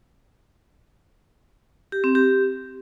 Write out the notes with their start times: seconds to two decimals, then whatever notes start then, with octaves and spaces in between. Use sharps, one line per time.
1.92 G4
2.04 C4
2.15 G4